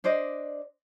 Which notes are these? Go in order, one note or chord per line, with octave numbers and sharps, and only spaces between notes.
D4 C5 D5 D#5